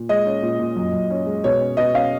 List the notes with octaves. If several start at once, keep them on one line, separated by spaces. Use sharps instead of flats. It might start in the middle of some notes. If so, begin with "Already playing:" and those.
Already playing: A#2
G#3 D#5
C#4
A#2
A#2
F#2
F#2
C#4
G#3
B2 C#5
C#4
B2 D#5
C#4 F5